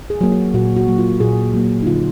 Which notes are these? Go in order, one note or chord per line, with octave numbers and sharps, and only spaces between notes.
G#4
F#3 A#3
F#4
A#2 F#4
F#4
F#3 A#3
F4
A#2 G#4
F#3 A#3 F#4
D#4
D3 F4